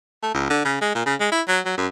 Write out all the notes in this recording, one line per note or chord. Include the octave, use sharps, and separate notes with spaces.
A3
C#2
D3
C#3
G#3
A#2
C#3
G#3
E4
F#3
F#3
F#2